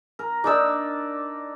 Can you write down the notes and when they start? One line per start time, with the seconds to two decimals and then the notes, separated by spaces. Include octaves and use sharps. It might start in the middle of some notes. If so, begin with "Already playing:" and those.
0.19 A#4
0.44 D4 D#4 A#4 D5 E6